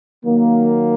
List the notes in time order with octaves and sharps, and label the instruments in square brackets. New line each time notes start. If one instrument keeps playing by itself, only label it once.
[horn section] D#3 F#3 A#3